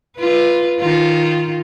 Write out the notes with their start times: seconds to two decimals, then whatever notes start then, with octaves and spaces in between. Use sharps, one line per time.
0.17 F4 B4
0.79 D#3 F4